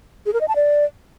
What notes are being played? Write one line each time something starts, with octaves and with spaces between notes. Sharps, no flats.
G#4
A#4
D#5
A5
D5